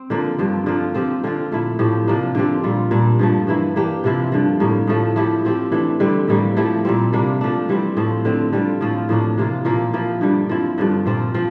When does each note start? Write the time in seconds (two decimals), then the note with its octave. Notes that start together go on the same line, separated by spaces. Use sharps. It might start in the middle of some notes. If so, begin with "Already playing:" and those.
Already playing: C4
0.10 D3 F3 A#3
0.38 G2 D3 F3 C4
0.66 D3 F3 A#3 F4
0.95 F3 C4 G4
1.24 D3 F3 C4 F4
1.52 A#2 A3 E4
1.79 A2 F3 C4 G4
2.08 C3 F3 A#3 D4
2.35 D3 F3 C4 G4
2.64 A#2 G3 C4 F4
2.91 A#2 G3 D4
3.19 G2 F3 A3
3.47 G2 E3 A#3 E4
3.76 E3 A#3 D4 G4
4.04 C3 F3 C4 E4
4.32 G2 D3 F3
4.60 A2 G3 A#3
4.87 A2 F3 A3
5.16 F3 A3 E4 G4
5.45 F3 C4 G4
5.72 E3 A3 D4
6.00 D3 G3 C4 G4
6.28 A2 E3 G3 A#3
6.57 F3 A3 E4 G4
6.85 A#2 G3 C4
7.13 C3 G3 A#3 D4
7.41 F3 A3 D4
7.69 E3 G3 C4
7.97 A2 F3 C4
8.25 D3 A3 C4
8.53 D3 G3 C4 F4
8.81 A2 F3 C4 F4
9.09 A2 F3 A#3 D4
9.38 C3 E3 A#3 F4
9.65 A#2 F3 A#3
9.93 F3 A#3 E4
10.21 G2 D3 G3
10.49 F3 C4 E4
10.78 G2 D3 F3
11.06 A#2 F3 C4 F4
11.34 F3 C4